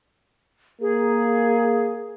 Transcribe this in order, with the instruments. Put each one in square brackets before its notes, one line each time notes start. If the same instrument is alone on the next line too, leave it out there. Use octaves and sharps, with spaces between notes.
[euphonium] A#3 [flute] G#4